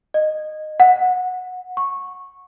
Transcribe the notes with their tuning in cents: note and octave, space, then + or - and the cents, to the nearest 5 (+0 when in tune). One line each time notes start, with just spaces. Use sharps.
D#5 -15
F#5 -20
C#6 -10